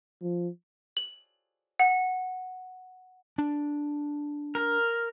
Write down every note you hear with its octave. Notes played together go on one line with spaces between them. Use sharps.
F3
F#7
F#5
D4
A#4